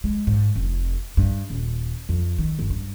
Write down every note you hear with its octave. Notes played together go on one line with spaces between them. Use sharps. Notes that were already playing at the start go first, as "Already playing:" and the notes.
G#3
G#2
F1
G2
D#1
F2
D#3
G1
G2